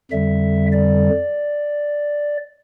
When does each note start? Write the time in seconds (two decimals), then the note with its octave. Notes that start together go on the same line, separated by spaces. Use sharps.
0.11 F2 D3 G3 E5
0.72 D5